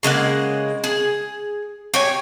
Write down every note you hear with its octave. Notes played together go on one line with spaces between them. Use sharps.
C#3 G#3 A#3 F#5
G#4
G4 C#5 G#5